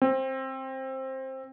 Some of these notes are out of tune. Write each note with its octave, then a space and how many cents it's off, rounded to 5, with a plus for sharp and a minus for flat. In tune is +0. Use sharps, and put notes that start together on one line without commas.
C4 +15